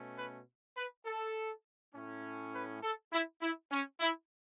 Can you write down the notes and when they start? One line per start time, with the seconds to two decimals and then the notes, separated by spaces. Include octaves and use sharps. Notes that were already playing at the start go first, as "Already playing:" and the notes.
Already playing: B2 A3 C#4
0.17 B4
0.76 B4
1.05 A4
1.93 A2 A3 C#4
2.53 B4
2.82 A4
3.12 E4
3.41 E4
3.71 C#4
4.00 E4